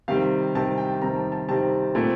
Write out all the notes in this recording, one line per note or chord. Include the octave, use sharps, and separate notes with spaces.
C3 D#3 G3 C4 F5
C3 D#3 G3 C4 A5
G5
C3 D#3 G3 C4 A#5
A5
A5
C3 D#3 G3 C4 A5
A#2 A3 C4